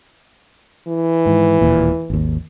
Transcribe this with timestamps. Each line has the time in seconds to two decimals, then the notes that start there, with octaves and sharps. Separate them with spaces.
0.88 E3
1.26 G#2 D#3
1.61 E1 D#2 A#2
2.10 G#1 D#2